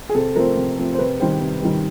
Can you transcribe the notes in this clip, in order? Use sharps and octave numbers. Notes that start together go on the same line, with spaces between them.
G#4
C3 A4
F3 A3 C4 A#4
C3
F3 A3 C4
C5
C3 B4
D#3 G3 C5
C3
D#3 G3